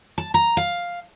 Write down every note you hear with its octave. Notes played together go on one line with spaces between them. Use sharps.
A5
A#5
F5